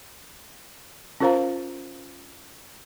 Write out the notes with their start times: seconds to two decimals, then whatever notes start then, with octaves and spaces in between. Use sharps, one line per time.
1.20 C#4 F4 A#4 C5 F5 A#5